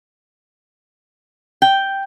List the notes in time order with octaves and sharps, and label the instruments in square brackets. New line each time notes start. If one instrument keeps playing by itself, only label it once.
[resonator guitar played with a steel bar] G5